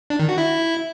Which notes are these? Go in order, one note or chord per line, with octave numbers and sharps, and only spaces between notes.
D4
D#3
F#4
E4